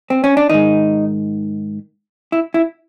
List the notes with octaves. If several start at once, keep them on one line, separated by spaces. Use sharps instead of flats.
C4
C#4
D4
G#2 D#3 D#4
E4
E4